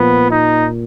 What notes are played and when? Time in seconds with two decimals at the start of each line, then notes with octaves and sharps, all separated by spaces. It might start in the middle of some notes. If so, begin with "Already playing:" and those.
Already playing: A#2 F3 B3
0.30 D#4